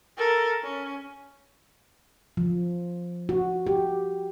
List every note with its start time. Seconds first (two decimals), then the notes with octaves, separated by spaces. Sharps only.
0.17 A4 A#4
0.63 C#4
2.37 F3
3.29 F#4
3.67 G4